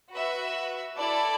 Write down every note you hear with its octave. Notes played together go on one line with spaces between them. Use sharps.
F#4 B4 E5
E4 A4 D5